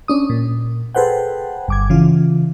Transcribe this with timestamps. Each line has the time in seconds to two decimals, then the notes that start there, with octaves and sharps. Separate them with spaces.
0.08 C#4 D4 D#6
0.30 A#2
0.95 G#4 A4 B4 C5 F#5 G5
1.68 G1 D6 G#6
1.90 C#3 E3 F4